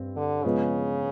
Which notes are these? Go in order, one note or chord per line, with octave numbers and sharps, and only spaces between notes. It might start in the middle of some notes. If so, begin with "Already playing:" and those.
Already playing: G2 C4
D3
C#3 F3 G#3 B3